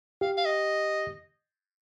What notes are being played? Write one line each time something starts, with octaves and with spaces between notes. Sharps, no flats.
G4 F5
F5
D#5